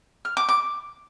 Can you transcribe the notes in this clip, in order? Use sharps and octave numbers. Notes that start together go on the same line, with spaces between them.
F6
D6
D6